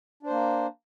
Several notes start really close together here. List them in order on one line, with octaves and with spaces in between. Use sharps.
D4 C5 A#3